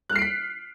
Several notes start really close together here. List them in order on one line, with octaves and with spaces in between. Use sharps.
F#6 F6 C7 D7 B6